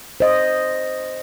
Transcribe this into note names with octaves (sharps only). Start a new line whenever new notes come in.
C5 D#5